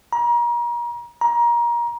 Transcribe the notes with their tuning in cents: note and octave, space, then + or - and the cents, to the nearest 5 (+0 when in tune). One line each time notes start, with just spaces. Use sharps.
A#5 +35
A#5 +25